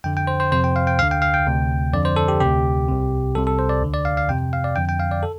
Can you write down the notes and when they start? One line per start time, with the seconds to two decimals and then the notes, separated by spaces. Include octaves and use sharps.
0.04 F2 D3 G5
0.17 G5
0.27 C5
0.40 C5
0.52 F2 C3 C5
0.64 G5
0.76 F5
0.87 G5
0.99 D2 D3 F5
1.11 G5
1.22 F5
1.34 G5
1.46 D2 C3
1.94 F2 D3 D5
2.05 C5
2.16 A4
2.28 G4
2.40 D2 C3 G4
2.88 C2 C3
3.35 C2 A4
3.38 C3
3.47 A4
3.59 C5
3.69 D5
3.82 D2 D3
3.94 D5
4.05 F5
4.17 F5
4.29 F2 C3 G5
4.53 F5
4.64 D5
4.76 F2 D3 G5
4.89 G5
5.00 F5
5.11 D5
5.23 A4